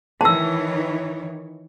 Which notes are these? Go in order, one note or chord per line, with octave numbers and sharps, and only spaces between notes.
D#3 E3 C#5 A5 E6